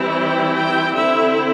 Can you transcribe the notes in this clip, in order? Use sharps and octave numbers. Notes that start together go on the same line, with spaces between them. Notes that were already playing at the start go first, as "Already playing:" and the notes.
Already playing: E3 G3 C4 E4
G5
G5
D3 C4 E4 E5